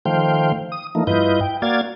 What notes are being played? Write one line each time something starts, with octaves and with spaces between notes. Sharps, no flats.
D#3 F3 A3 C5 F5 G5
D#6
E3 F3 A3 A#3 D#4
G2 E4 F4 B4 D#5 G6
G5
A#3 F#4 D5 F5 G#6 A6